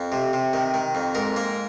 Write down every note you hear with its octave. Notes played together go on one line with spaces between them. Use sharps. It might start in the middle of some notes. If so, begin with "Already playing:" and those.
Already playing: F2
C3
C3
D#3
D#3
F2
G#2 A#4
A#3